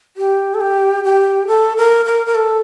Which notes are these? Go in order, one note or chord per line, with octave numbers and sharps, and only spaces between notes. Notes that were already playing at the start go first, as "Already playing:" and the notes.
G4
A4
G4
G4
A4
A#4
A#4
A#4
A4